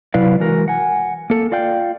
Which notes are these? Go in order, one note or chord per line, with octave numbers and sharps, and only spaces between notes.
C3 F#3 E4 B4 D5 F5
E3 G#3 F#4 A#4
F#5 G#5
A#3 A4
F4 D5 F5 G5